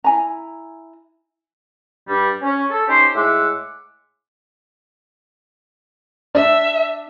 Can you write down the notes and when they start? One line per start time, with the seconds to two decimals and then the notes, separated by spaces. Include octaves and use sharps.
0.04 E4 G#5 A#5
2.08 G2 G3
2.42 C#4
2.71 A4
2.87 C#4 D#4 G4 C5
3.15 A2 G#3 E5 F#5 D6
6.35 D4 E5